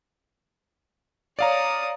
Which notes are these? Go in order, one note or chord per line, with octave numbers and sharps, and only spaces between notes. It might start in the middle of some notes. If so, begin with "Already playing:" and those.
C#5 D5 F5 A#5 D#6